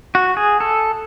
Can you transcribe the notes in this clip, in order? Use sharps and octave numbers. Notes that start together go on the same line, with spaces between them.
F#4
G#4
A4